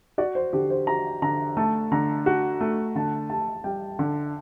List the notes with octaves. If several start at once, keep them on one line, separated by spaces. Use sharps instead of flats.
F#4 D5
C5
D3 G4
C5
F#4 A#5
D3 A#5
A3 A5
D3 A#5
F#4
A3
D3 A5
G4 A5
G3 G5
D3